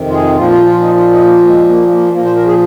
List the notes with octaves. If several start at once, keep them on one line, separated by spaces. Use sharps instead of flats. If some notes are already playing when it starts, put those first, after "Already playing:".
Already playing: F2 C3 D#3
F4
G#4
A#2 F3 F4
F4
F4
D#4
F4
D#4
A#3
G#3
A#3
A#3
A#2 F3 A#3
C5
A#4
G#4